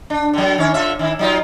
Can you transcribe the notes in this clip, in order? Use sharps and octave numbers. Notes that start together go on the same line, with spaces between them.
D4
D3 F#3
D#3 C#4 C#5
D3 F4 E5
D#3 E4
F#3 D#4 F4